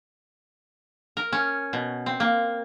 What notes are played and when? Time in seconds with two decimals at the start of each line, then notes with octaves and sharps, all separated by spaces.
1.17 A#4
1.33 C#4
1.73 B2
2.06 C4
2.20 A#3